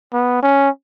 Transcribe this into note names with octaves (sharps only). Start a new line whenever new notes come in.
B3
C#4